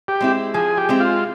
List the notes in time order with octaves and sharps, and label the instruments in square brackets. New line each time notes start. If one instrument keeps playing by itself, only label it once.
[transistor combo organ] G4
[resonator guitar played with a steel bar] G#3 C4 E4
[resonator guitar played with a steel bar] F3 [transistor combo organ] G#4
[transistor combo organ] G4
[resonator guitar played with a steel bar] G#3 C4 E4
[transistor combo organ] F4